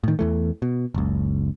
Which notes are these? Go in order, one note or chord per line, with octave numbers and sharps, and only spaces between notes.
A2 D#3
E2 E3 A3
B2
F#1 C#2